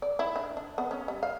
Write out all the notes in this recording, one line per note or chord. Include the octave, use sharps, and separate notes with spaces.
D5
E4
D4
D4
B3
C#4
G3
F5